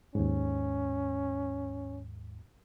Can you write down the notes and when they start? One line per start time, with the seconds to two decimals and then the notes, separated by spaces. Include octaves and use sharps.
0.15 D#2 G#2 C#4